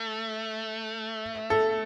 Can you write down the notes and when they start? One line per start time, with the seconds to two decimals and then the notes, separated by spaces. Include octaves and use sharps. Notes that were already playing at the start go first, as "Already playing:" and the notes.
Already playing: A3
1.50 A4